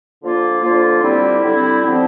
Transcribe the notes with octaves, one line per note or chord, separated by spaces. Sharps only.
D3 F3 A#3 F4
D3 F3 A#3 F4
D3 G3 C4 E4
D3 G3 C4 E4
D3 F3 C4